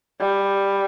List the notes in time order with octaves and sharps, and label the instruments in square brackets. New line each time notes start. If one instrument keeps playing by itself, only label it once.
[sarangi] G3